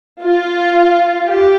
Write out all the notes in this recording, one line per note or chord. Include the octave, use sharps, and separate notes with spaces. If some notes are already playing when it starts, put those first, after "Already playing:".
F4
G4